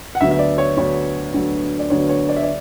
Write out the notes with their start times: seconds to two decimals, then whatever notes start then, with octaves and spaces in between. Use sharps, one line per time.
0.15 F#5
0.21 D2 D3 F#3 B3 E5
0.31 E5
0.39 D5
0.58 C#5
0.77 D2 D3 F#3 B3 C#5
1.34 D2 D3 F#3 B3
1.79 D5
1.90 D2 D3 F#3 B3 C#5
2.09 C#5
2.29 D5
2.36 E5
2.43 D5